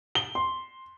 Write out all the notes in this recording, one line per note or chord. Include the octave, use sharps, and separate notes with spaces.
G7
C6